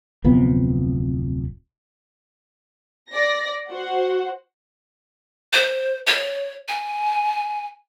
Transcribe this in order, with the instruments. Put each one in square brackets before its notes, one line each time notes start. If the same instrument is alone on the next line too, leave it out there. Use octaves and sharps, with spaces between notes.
[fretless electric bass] D1 F2 C3 B3
[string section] D5 A#6
F#4 C5 F#5
[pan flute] C5
C#5
G#5